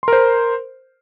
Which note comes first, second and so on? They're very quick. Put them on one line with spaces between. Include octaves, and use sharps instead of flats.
C6 A#4 C5